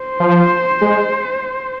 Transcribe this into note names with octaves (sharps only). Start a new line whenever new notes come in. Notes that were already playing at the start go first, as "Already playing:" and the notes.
Already playing: C5
F3
G#3